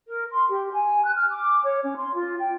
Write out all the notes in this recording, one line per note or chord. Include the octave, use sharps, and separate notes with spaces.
A#4
C6
G4
G#5
F#6
F6
D6
C#5
C#4
C6
F4
G5